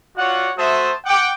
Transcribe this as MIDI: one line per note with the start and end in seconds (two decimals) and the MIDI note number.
0.17 0.49 65
0.17 0.49 66
0.17 0.49 73
0.17 0.49 74
0.17 0.49 78
0.57 0.91 57
0.57 0.91 66
0.57 0.91 72
0.57 0.91 76
0.57 0.91 81
0.57 0.91 87
1.06 1.29 78
1.06 1.29 79
1.06 1.29 86